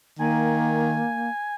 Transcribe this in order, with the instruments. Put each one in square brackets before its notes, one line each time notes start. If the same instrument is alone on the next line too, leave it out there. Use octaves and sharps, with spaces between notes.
[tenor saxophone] D#3 [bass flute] A#3 [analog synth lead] G#5